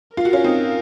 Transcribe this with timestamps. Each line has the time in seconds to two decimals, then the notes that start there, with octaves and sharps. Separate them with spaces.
0.17 F4 A#4
0.25 F#4
0.33 C#4 F4
0.44 C4 D#4